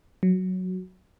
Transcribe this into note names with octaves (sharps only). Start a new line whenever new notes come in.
F#3